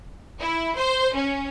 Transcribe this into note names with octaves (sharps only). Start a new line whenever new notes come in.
E4
C5
C#4